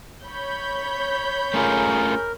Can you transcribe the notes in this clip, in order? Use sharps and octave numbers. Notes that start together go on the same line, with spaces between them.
C#5 B5 G6
A3 C#4 F4 G#4 A#4